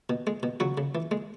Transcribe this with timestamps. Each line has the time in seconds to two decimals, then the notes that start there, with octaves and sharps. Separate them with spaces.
0.10 B2
0.27 G#3
0.43 B2
0.60 C#3 F#3 F#4
0.78 C#3
0.95 E3
1.11 G#3